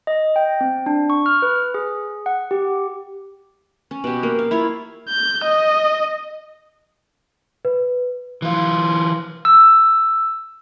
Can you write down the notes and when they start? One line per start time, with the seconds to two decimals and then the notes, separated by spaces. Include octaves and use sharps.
0.07 D#5
0.36 G5
0.61 C4
0.86 D4
1.10 C#6
1.26 F6
1.42 B4
1.74 G#4
2.26 F#5
2.51 G4
3.91 C#4
4.04 B2 G4
4.23 A#3
4.39 F5
4.51 E4 F4 C#5
5.09 G6
5.44 D#5
7.65 B4
8.42 E3 F4
9.45 E6